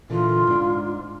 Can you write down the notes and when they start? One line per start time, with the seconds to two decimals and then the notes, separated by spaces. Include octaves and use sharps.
0.10 A#2 D3 E3 F4
0.47 G#2 D4